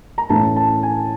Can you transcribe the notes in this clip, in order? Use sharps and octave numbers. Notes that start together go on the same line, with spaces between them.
A#5
A2 E3 A3 C#4 A5
A5
G#5